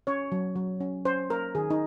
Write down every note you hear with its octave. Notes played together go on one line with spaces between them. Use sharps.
C#4 C#5
F#3
F#3
C#4
C#4 C5
A#3 A#4
D#3 G#4
D#4